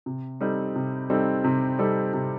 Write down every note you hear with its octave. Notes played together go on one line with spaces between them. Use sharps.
C3
G3 C4 D#4 A4
C3
G3 C4 D#4 A4
C3
G3 C4 D#4 A4
C3